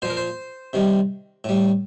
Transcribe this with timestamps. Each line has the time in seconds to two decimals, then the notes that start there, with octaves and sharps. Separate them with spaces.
0.02 A#2 F3 C5
0.10 A#4
0.17 C5
0.73 C3 D#3 G3
1.44 A2 G3